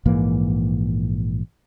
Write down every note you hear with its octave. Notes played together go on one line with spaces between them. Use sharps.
A#1 G#2 E3 A#3